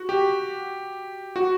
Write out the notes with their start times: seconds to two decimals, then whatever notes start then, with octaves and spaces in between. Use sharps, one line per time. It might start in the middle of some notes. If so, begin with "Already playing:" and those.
Already playing: F#4
0.09 G4
1.36 F#4